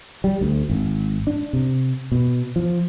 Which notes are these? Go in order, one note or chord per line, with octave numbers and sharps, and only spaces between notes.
G3
D2
G#1
D4
C3
B2
F3